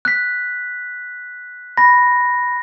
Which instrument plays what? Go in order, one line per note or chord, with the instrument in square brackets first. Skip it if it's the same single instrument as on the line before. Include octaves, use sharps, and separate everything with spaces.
[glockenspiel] F#6 B6
[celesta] B5 [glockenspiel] A#6